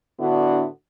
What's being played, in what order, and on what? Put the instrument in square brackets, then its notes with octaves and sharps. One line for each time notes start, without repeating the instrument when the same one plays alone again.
[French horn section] A2 D3 B3 D4 E4 F#4